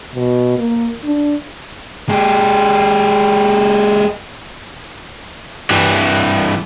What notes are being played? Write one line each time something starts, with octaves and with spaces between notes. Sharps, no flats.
B2
A#3
D4
G#3 G4
G2 E3